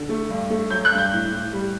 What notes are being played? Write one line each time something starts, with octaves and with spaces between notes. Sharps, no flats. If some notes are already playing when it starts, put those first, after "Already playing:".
Already playing: D3
A3
G2
A3
F#3 G6
F#6
G2
G6
A2
A2
G3